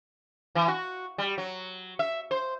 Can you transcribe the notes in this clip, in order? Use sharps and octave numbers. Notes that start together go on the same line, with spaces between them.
E3
F#4
G3
F#3
E5
C5